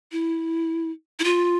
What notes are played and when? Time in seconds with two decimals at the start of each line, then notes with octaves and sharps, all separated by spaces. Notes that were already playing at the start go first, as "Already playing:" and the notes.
0.12 E4
1.19 E4
1.24 F4